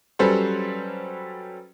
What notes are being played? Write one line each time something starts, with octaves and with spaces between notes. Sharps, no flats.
F#3 G3 C#4 A4 B4 C5